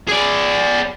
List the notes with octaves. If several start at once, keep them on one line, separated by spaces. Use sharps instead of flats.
G#4 D5